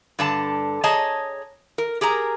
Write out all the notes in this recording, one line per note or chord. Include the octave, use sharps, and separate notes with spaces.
G2 D3 A5
G#4 C#5 D#5 A5 A#5
A#4
G4 G#4 A#4 A#5